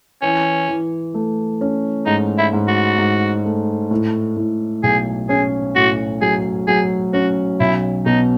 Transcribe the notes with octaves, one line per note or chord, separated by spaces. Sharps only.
E3 C#4
E3
A3
C#4
G#2 D#4
E4
G#2
F#4
G#2
A3
A2
A2
B1 G#4
C#4 G#4
A2 F#4
F#3 G#4
F#3 G#4
C#4 F#4
B1 E4
B2 D#4